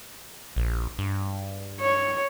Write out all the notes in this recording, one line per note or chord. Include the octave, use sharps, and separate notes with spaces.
A#1
G2
C#5